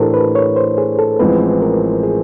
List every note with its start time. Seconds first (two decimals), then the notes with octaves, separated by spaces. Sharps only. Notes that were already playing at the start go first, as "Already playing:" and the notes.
Already playing: A2 E3 A3 D4 G4 A4 A#4 C5
0.14 B4
0.35 C#5
0.56 C5
0.78 G#4
0.98 A4
1.19 A1 A2 F3 G#3 C4 B4
1.62 A#4
2.03 G#4